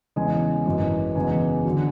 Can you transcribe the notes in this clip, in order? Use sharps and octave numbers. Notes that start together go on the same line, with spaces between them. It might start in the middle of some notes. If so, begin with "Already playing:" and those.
E2 C#3 E3 G#3 G#5
G#1 F#2 E3 G#3
E2 C#3 E3 G#3 G#5
D3 F#3